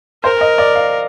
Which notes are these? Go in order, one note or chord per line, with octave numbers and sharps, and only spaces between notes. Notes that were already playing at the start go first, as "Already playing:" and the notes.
A#4 C5
D#5
D5
F5